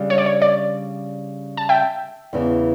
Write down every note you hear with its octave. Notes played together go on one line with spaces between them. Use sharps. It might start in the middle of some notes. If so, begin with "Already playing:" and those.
Already playing: C#3 G3 D4
C#5
D5
C#5
D5
A5
E5 G5
E2 C#3 E3